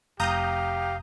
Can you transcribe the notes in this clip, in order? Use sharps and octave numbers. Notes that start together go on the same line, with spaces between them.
F1 G4 F5 A#5 D#6 G6